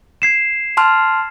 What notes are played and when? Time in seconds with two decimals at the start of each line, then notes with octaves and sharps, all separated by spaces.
0.22 G#6 C7 E7
0.77 A5 C6 F6